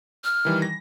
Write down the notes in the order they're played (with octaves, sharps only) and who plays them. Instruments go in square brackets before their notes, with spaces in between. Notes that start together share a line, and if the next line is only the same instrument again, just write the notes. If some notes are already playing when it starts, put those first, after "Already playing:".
[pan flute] F6
[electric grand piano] D#3 E3 G3
A#6